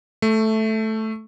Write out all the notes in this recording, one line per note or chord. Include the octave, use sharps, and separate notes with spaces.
A3